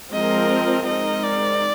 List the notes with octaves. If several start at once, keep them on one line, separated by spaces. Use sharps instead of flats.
F3 G#3 C4 F4 A#4 D#5
G#3 C4 D#4 A#4 D#5
D5